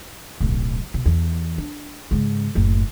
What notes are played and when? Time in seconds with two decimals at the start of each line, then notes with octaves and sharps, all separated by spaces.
0.40 D1 B1
0.94 B2
1.06 E2
1.58 D4
2.11 G#2 C#3
2.55 F#1 A2